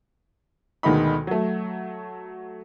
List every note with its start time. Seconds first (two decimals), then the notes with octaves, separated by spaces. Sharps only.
0.83 D2 B2 D#3 G#3 D#4 B5
1.27 F#3 A3